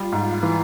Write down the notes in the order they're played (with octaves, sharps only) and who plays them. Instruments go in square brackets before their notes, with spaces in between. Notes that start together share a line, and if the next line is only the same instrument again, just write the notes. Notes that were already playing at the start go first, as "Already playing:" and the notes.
Already playing: [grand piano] G3 [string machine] F4
[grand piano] G#2
E3